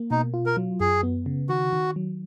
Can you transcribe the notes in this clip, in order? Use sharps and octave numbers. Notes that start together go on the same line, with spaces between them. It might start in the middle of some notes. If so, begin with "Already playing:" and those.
Already playing: A#3
B2 D#4
F4
A#4
F#3
F#2 G#4
B3
C#3
D#3 F#4
D#3
F#3